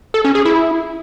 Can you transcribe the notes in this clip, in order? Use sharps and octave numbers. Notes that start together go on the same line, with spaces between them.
A4
C#4
G#4
E4